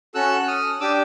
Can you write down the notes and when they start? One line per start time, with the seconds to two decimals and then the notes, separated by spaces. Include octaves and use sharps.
0.15 C#4 F#4 A4 E6 F#6
0.40 F#6
0.48 D#6 F6
0.81 D4 G4 D6 E6